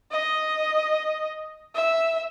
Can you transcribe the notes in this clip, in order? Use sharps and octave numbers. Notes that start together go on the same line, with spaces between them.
D#5
E5